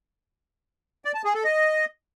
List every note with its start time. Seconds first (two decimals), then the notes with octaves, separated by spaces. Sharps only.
1.05 D5
1.15 A5
1.25 G#4
1.34 A4
1.44 D#5